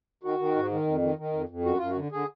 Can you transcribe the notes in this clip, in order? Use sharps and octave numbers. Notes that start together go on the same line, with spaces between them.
D#3 F#4
D#3
G#2
D#3
F2
D#3
D#3
F2
F2
F#2 F#4
F#2 F4
F#4
D3
D3 G#4